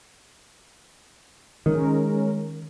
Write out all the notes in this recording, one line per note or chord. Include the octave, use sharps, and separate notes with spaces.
D#3 G#3 C#4 A#4